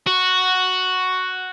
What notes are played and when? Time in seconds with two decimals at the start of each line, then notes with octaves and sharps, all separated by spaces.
0.07 F#4